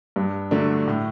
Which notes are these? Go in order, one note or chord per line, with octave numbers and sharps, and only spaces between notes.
G2
D3 F#3 A3 D4
A2